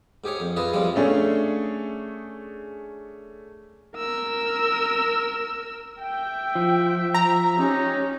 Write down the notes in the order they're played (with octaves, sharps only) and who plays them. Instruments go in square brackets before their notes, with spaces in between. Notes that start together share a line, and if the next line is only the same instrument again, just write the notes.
[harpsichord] G#2 G4 G#4 C#5
F2
F4 G#4 B4 D#5 E5
F3 G3 G#3 C4 F4
[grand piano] A3 C#4 D4 G#4
[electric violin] A#4 E6
[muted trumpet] E5 [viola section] G5
[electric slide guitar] F3
[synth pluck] A#5
[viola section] C#4 G4 [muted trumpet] D#4